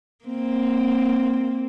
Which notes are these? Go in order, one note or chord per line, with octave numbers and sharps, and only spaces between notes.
A#3 C4